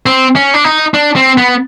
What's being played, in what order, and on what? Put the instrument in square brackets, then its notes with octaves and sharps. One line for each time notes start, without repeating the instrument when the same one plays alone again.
[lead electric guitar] C4
C#4
D4
D#4
D4
C4
B3